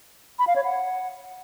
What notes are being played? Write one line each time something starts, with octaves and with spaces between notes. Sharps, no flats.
B5
F5
C#5
F#5